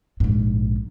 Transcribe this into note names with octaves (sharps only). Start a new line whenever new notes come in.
A#1 G#2